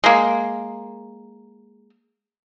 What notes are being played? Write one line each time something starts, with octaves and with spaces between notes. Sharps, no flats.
G#3 A#3